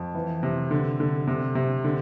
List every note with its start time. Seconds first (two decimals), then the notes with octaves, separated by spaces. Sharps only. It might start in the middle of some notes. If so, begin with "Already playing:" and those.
Already playing: F2
0.15 E3
0.43 C3
0.71 D3
1.00 D3
1.27 C3
1.55 C3
1.84 D3